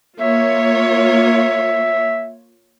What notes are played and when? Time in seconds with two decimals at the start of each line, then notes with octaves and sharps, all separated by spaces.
0.20 A#3 F4 C#5 E5